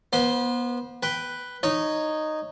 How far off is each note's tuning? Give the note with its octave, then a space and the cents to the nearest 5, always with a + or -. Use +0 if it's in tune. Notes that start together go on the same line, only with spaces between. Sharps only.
B3 -30 C5 +0
B4 +0 G5 +0
D#4 -10 C#5 +0